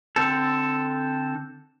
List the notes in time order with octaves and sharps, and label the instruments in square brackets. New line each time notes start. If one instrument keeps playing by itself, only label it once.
[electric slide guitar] D3 C4 A4